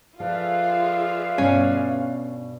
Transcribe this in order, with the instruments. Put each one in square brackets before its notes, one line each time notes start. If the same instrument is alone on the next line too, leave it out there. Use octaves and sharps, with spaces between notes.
[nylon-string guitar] F3 A4 [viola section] F4 G#4 E5 [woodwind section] B4 D5 F5
[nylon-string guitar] G2 B2 [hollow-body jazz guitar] C#4